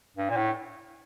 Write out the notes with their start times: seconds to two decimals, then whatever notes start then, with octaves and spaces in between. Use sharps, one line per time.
0.17 G2
0.29 A#2
0.37 A2